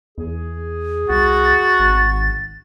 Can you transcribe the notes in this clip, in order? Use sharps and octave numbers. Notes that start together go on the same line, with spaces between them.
E2 G#4
C2 F#4 A6
G#1